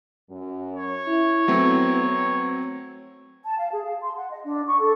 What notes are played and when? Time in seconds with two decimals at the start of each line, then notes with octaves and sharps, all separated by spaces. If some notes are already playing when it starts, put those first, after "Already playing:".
0.29 F#2 F#3 C#4
0.76 C#5
1.06 E4
1.48 F#3 A3 B3 C4
3.44 A5
3.58 F5
3.72 G#4
3.84 F5
4.02 C6
4.16 F#5
4.31 D#5
4.44 D4
4.67 C#6
4.79 A4